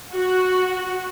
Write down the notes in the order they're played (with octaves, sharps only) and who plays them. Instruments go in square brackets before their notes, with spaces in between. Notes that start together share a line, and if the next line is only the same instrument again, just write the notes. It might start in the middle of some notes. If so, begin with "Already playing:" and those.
[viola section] F#4